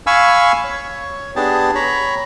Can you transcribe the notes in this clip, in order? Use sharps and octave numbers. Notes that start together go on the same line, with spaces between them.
F5 G#5 B5 C#6 E6
C#5
B3 D4 G4 G#4 A5
C#5 A#5 B5